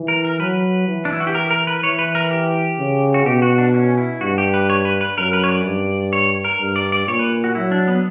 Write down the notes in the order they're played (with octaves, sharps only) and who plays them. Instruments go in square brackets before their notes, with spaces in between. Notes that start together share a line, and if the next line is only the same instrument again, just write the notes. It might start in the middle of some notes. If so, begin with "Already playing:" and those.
Already playing: [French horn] E3
[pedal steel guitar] A#4
A#4
[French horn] F#3 [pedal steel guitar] B4
[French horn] E3
[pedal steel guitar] D4
E4
F#4
G4
A#4
A#4
B4
[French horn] E3 [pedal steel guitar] C#5
[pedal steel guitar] B4
A#4
G4
[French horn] C#3
[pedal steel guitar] F#4
[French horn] B2 [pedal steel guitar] G4
[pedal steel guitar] F#4
D4
C#4
E4
[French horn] G2 [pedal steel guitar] F#4
[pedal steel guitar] G4
B4
C#5
B4
B4
[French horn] F#2 [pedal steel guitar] A#4
[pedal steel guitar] B4
C#5
D5
[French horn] G2
[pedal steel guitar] C#5
A#4
[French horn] G2
[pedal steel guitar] D5
D5
[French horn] A#2 [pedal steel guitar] C#5
[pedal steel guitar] B4
F#4
[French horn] F#3 [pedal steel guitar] E4
[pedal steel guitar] D4
B3